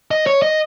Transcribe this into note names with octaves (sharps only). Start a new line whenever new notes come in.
D#5
C#5
D#5